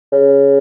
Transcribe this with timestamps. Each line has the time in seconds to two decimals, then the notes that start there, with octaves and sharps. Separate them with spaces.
0.12 C#3